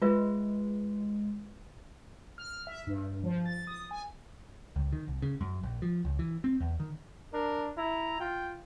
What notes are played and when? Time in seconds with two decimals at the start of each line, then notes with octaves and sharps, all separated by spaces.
0.02 G#3 F4 B4 E5
2.38 F6
2.67 E5
2.87 G2
3.24 F3
3.46 A6
3.67 D#6
3.91 G#5
4.76 C#2
4.93 D#3
5.08 C2
5.22 C#3
5.41 F#2
5.63 A#1
5.82 F3
6.05 C#2
6.19 E3
6.44 C4
6.60 E2
6.80 D#3
7.33 D4 A#4
7.77 E4 A#5
8.20 F4 G5